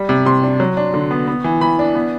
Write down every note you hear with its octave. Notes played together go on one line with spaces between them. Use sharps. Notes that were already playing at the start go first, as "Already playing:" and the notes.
Already playing: G3
C3
C3 C6
D4
F#3
D4
D3
B3
B3
E3
E3 B5
D4
B3